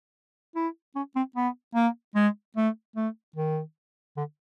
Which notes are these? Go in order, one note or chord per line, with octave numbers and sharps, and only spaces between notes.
E4
C#4
C4
B3
A#3
G#3
A3
A3
D#3
D3